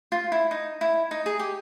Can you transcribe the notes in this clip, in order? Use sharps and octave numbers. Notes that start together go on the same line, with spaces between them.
F4
E4
D#4
E4
D#4
G#4
G4